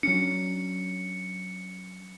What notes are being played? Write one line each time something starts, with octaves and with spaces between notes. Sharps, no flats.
F#3 C#4 D4 C#7